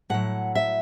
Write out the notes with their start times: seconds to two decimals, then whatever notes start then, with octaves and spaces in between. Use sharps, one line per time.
0.10 A2 F#3 F#5
0.55 E5